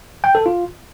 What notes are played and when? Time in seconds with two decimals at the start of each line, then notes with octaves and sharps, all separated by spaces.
0.24 G5
0.35 A4
0.46 F4